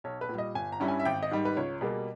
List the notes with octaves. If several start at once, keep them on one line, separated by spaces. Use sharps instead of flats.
B1 C#5
B4
A#2
G3 D#5
G1 G#5
A#5
G2 G3 C#4 E4
G#5
E5
G#1 G5
D#5
G#2 D#3 G3
B4
C#2 C#5
B2 G3 A#3 G#4